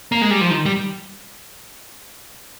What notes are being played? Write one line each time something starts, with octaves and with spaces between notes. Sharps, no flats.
A#3
G#3
G3
F3
D#3
G3